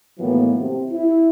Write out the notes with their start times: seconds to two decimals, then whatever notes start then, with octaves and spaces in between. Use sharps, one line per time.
0.19 A2 D#3 E3 F#3 A#3 B3
0.57 C3
0.91 E4